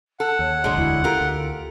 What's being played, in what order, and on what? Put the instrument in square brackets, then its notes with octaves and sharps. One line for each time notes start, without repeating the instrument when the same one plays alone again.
[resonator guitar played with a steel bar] A4 [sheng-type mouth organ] F#5
[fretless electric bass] D#2 [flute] C#5
[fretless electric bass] B1 A2 [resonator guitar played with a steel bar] D3 F#3 G#3 [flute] C6
[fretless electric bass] E1 D2 [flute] E4
[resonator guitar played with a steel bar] F4 G4 A#4 [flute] A4
[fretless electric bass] D2